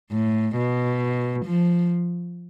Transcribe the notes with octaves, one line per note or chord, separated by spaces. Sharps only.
A2
B2
F3